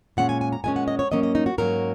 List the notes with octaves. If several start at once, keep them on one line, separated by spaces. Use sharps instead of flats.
A#2 G#3 C#4 F#5
G#5
G#5
A#5
A#2 G#3 C#4 G#5
F#5
D#5
C#5
G#2 F#3 A#3 C#4 D#5
D#5
D#4
F#4
G#2 F#3 A#3 C#4 A#4